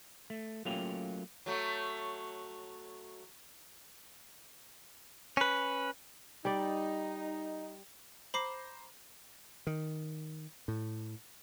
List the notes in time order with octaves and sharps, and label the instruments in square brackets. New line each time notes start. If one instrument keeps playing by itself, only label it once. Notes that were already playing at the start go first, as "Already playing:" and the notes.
[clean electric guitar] A3
F#3 A3 A#3 C#4 F4 G4
[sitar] F#3 A3
[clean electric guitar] C#4 B4
[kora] G3 D5 [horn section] D#4
[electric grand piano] C5 A#5 [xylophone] B5 D6 C7
[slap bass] D#3
A2